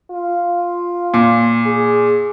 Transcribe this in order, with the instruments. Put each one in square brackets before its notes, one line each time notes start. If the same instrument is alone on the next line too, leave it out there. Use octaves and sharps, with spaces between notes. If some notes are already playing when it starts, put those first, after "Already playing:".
[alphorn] F4
[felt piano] A#2
[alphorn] G#4